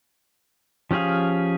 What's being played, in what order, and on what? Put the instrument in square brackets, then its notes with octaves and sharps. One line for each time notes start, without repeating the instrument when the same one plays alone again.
[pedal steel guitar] F3 C#4 G4 G#4 F5